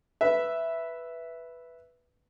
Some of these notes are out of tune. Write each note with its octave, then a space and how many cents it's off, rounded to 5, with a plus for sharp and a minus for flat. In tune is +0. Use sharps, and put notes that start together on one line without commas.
B4 +0 E5 +0